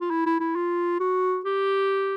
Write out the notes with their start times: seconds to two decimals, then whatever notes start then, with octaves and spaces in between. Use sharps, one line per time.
0.01 F4
0.11 E4
0.26 E4
0.40 E4
0.56 F4
1.00 F#4
1.46 G4